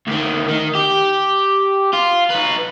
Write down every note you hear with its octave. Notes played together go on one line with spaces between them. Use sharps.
D2 D#3
D#3
G4
F4
D#4 B4